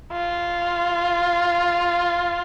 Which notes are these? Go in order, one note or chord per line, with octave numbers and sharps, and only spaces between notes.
F4